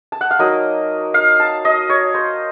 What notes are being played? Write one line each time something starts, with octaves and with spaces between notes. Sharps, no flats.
A5
F#5
F5
F#3 A#3 D#4 D#5
F5
A5
D#5
C#5
C5